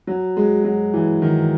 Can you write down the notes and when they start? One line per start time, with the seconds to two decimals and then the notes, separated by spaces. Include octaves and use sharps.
0.07 F#3
0.37 G#3
0.64 F#3
0.93 E3
1.22 D#3